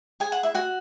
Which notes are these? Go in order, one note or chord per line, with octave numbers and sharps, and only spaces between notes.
G#4 G#5
F#5
E4 E5
F#4 F#5